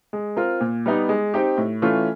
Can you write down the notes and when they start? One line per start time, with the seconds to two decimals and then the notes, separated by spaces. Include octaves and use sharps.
0.13 G#3
0.37 C4 F4 A#4
0.61 A#2
0.86 G3 B3 D#4
1.09 G#3
1.34 C4 D#4 G4
1.58 A2
1.82 E3 A3 C#4 F4